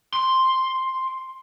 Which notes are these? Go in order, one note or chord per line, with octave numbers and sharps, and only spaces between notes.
C6